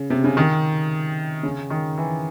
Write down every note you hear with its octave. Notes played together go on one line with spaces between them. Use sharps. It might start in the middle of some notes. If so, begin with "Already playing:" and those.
Already playing: C#3
C3
C#3
D#3
C#3
D#3
E3